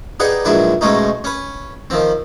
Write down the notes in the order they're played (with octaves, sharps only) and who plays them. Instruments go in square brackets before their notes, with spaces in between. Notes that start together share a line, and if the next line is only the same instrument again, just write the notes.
[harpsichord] D#4 G4 G#4 B4 D5 F#5
A#1 G#2 F#3 D4 E4 B4
G#2 B2 G#3 A3 C#4 D#4
C#4 B4
D#3 F3 C4